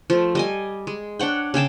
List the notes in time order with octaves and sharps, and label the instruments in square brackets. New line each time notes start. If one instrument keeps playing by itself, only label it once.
[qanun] F3 A3
G3 D#5 G#5
G#3
D4 C#5 F#5 G5
C#3 G#4 G5 A5